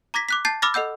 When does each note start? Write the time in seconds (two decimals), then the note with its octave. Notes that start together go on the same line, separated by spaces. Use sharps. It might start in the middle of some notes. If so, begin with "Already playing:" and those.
0.14 A#5 D6 G#6 A#6 B6
0.29 D6 F#6 B6
0.45 A5 G6 A6 C7
0.62 B5 D6 E6 F6 A6 A#6
0.74 A4 D#5 F#5 E6 G6